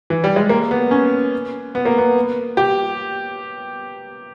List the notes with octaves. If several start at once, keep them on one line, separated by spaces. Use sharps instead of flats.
E3
G3
G#3
A#3
B3
C#4
B3
A#3
B3
G4